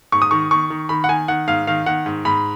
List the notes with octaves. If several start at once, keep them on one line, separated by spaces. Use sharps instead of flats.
G#2 C#6
D#6
D#3 C#6
D#3 C#6
D#3
D#3 B5
F#5
D#3 G#5
D#3 F#5
G#2 F5
D#3 F5
D#3 F#5
G#2
G#2 B5